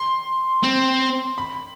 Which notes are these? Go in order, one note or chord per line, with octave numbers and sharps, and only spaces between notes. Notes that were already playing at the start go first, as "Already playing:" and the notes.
Already playing: C6
C4
B5